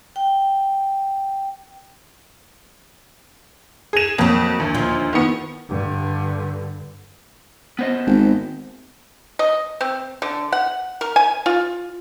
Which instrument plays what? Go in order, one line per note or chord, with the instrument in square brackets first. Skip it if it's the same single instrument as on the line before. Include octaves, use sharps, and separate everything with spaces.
[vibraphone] G5
[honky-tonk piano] G#4 E7
[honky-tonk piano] F2 [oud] F#3 A#3
[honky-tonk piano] D2
[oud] D#2 F3
[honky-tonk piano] D#3 B3
[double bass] G2 D3
[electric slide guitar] B3 C5 D#5
[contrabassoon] G#1
[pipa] D#5
C4
D3
F#5
A#4
G#5
F4